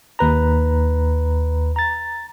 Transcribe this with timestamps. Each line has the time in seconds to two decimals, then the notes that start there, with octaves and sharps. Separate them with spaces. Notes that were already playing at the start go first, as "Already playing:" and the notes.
0.19 D#2 B4 A#5
1.76 A#5 A6